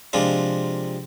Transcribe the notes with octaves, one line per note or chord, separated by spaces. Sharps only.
C3 F3 G#3 D4 F4